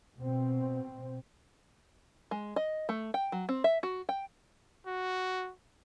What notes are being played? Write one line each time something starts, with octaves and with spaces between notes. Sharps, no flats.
B2 C4
G#3
D#5
A3
G5
F#3
C4
E5
F#4
G5
F#4